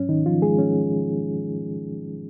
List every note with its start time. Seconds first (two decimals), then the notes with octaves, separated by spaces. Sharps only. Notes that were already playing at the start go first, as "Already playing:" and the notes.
Already playing: G#2 F#3 C#4
0.09 D#3 D#4
0.26 F3 F4
0.42 G#3 G#4
0.59 C#4